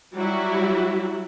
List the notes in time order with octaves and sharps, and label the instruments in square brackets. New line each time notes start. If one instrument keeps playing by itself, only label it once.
[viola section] F#3 G3 E4 F#4